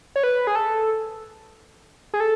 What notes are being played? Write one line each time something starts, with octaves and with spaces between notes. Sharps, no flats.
C#5
B4
G#4
A4
G#4
A4